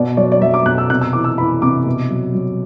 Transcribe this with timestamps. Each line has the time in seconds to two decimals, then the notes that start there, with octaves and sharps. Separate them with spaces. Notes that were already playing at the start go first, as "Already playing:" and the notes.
Already playing: B2 D5
0.17 F#3 D5
0.32 D5
0.42 F#3 E5
0.54 D6
0.66 B2 F#6
0.78 E6
0.90 C3 F#6
1.01 E6
1.13 E3 D6
1.24 E6
1.38 E3 B5
1.62 C3 D6
1.86 B2
2.10 F#3
2.35 F#3